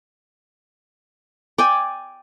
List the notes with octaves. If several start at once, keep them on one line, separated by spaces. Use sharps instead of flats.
D5 G5 G#5